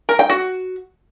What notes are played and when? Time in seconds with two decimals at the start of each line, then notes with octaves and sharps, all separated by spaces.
0.09 A#4
0.19 G5
0.29 F#4